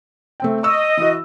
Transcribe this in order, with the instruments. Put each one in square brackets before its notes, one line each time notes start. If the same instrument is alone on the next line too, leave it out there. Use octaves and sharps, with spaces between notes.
[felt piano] A3 C4 G5
[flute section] D#5 [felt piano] C#6 E6
[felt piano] E3 F#4